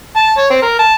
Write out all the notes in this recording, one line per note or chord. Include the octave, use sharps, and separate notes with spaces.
A5
C#5
C4
A#4
A5